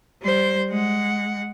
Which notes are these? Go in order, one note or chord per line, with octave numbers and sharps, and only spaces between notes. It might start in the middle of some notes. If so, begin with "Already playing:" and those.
G3 C5
G#3 F#5